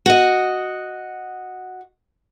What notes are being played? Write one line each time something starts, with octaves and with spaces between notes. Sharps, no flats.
F#4 D#5